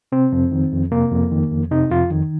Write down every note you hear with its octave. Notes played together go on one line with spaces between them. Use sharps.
C3 C4
F2
D#3
F2
C3 A#3
F2
D#3
F2
C3 D#4
F2 F4
D#3